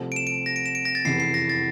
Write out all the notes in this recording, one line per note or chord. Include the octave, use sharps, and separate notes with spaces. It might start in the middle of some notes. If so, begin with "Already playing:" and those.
Already playing: C2 C3 F3 A3 C4
D7
E7
D7
A#6
D7
E7
D7
A#6
A6
F1 E2 E3 C7
C7
A#6
A6